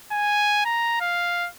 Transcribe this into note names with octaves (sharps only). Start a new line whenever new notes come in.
G#5
A#5
F5